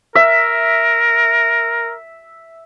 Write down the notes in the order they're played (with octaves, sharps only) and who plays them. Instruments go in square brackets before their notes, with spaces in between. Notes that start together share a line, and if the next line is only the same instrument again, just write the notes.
[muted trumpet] A#4 [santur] E5